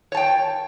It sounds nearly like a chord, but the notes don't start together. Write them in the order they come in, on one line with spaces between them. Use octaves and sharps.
C#5 A5 G5